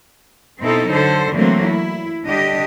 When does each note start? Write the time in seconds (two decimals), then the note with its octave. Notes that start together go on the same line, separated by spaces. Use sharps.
0.61 B2 C4 D#4 E4 A4
0.91 D3 F#3 A4 C5
1.32 D3 E3 F#3 A3 A#3 C4
1.67 E4
2.27 D3 G3 D4 G4 D#5